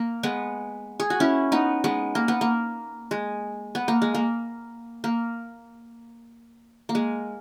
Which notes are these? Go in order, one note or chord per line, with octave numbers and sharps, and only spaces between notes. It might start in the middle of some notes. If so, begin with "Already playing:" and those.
Already playing: A#3
G#3 B3
G#4
F#4
C#4 E4
B3 D#4
G#3 B3
A#3
B3
A#3
G#3
B3
A#3
G#3
A#3
A#3
A#3
G#3